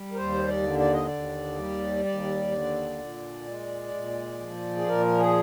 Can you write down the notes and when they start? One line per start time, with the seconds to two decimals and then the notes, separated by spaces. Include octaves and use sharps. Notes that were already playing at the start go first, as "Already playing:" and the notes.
Already playing: G3
0.12 A#4
0.16 D#2 C5
0.48 D5
0.63 D3
0.79 D5
0.93 D#5
1.06 D#2 D5
1.59 G3
2.05 D#2 D5
2.52 D3
2.99 A#2
3.47 G#3
3.94 A#2
4.40 F3
4.76 G#4
4.87 A#2 A#4
5.18 G#4